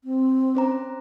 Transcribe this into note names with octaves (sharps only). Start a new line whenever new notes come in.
C4
C#4 C5 A#5